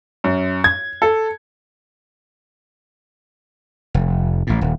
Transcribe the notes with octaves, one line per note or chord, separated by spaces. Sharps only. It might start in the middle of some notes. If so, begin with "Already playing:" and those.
F#2
G#6
A4
F1
A1 A2
D#1